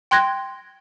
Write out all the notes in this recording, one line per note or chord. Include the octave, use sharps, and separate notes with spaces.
G5 C6 F#6 G#6 A#6